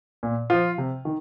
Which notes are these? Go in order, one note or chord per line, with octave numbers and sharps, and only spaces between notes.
A#2
F3 F4
C3
D#3